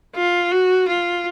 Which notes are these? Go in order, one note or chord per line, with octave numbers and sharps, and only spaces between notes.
F4
F#4
F4